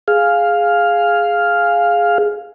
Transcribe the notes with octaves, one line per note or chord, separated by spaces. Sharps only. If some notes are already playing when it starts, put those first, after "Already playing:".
G#4 F5